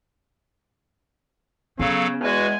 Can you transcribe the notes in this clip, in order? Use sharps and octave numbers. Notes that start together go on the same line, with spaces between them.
C#3 F#3 B3 A4 F5
E2 G#3 F#4 B4 G#5